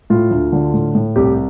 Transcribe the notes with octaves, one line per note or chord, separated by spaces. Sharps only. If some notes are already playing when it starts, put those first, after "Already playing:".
A2 F4
D2
D3
A2
A2
C2 G4